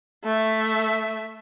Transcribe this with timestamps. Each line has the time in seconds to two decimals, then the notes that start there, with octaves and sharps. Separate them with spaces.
0.24 A3 E5